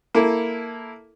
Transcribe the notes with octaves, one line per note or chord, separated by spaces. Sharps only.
A#3 E4 A4